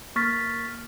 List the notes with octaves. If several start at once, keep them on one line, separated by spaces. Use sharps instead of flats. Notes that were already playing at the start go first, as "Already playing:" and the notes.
A#3 C#6 F6 A6 B6